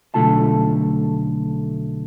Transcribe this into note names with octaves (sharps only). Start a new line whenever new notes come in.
B1 D3 F3 A3 F4 A5